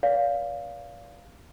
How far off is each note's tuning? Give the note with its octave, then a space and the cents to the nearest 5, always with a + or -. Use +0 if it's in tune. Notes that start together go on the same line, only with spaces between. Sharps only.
B4 +0 D5 -35 F5 +0